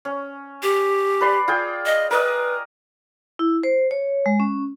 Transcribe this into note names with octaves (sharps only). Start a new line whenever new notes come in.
C#4
G4
B4 D5 C6
F4 G#4 G5
D#5
A#4 B4 D5 D#5
E4
C5
C#5
G#3
C#4